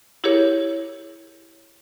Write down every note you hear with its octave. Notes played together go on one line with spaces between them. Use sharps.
E4 G4 G#4 A#4 C#5